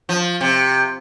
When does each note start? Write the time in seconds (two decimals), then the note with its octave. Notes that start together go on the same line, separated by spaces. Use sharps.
0.09 F3
0.41 C3